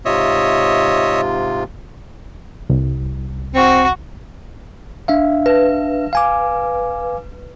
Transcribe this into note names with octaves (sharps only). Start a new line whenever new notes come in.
G#2 C3 F4 C#5 D#5 E5
C2
C4 F#4 C#6
D4 E5 F5
B4
F5 G#5 D6